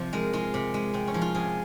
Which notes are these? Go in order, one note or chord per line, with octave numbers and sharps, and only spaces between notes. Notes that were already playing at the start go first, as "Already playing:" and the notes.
Already playing: C3 F3 C5
G#3 A#4
G#3 F4
C3
G#3
C3 C4
C#4
F3
F4
C3 G#4